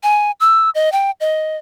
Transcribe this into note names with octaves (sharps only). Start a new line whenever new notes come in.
G#5
E6
D#5
G5
D#5